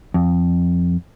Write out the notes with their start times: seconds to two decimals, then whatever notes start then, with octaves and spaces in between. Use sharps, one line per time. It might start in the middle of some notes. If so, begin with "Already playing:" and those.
0.14 F2